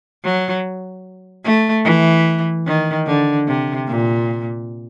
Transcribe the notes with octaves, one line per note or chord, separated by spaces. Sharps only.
F#3
A3
E3
D#3
D3
C3
A#2